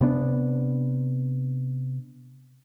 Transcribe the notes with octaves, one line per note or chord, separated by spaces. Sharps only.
C3 B3 D4